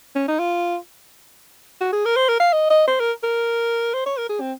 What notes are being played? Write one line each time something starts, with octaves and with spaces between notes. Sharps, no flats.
C#4
D#4
F4
F#4
G#4
A#4
C5
A#4
F5
D#5
D#5
C5
A#4
A#4
C5
C#5
A#4
G#4
C4